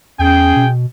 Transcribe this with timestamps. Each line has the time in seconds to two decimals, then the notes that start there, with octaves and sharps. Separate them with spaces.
0.19 E2 C#4 G#4 G5
0.56 B2